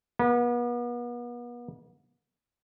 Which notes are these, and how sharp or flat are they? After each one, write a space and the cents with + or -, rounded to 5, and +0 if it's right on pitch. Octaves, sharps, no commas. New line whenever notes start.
B3 -40